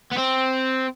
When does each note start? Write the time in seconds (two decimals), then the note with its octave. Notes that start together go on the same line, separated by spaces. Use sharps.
0.13 B3
0.18 C4